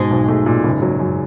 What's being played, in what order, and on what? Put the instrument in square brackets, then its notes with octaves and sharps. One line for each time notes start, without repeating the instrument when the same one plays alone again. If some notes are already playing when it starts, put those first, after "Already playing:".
Already playing: [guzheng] G#2 G#3 [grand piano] B2
[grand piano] B1
A3
A#2
F#1
F#3
F#2